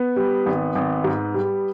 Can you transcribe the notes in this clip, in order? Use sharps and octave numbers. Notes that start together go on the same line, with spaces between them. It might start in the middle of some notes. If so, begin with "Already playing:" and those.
Already playing: B3
G3
G#1
G#1
G#2
G3